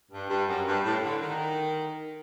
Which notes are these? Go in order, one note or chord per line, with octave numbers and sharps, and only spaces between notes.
G2
G2
F#2
G2
A2
D3
D#3